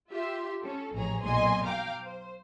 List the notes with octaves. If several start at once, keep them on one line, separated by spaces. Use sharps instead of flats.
F4 G4 E5 C6
C#4 A4
A1 F2 G#4 C#5 A#5
B1 F#2 A#2 D#5 G#5 C6
F5 G5 A#5 D6
C5